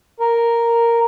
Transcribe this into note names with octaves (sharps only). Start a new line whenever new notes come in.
A#4